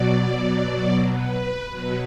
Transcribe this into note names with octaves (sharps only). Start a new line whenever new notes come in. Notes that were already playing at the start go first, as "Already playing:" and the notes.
Already playing: B2 F#3 D5
B4
B2 F#3 B4